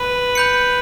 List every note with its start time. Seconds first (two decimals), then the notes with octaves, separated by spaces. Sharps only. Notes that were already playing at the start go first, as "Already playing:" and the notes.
Already playing: B4
0.35 B5 G6 C#7